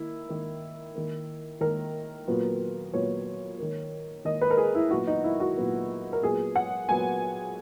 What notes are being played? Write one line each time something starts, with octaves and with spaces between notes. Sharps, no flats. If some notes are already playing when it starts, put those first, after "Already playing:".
Already playing: D#3 A#3 E4
D#3 A#3
D#3 A#3
D#3 A#3 A#4
A#2 F#3 B3
A#2 F#3 B3 C#5
D#3 A#3
D#3 A#3 D#5
B4
A#4
G#4
E4
A#2 F#3 B3 F#4
D#4
E4
F#4
A#2 F#3 B3
A#4
A#2 F#3 B3 G#4
F#5
A#2 F#3 B3 G#5